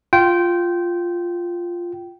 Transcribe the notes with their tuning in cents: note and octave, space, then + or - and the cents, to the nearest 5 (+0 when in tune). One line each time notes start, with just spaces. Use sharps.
F4 -5 G5 -20